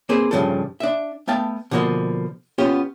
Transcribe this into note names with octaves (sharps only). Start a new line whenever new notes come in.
A#3 C4 G#4 B4 C5
G2 A#2 C#3 F3 A4
D4 E5
A3 B3 F5 G5 A5
B2 D3 F3 A#3 D#5
B3 C#4 F4 G4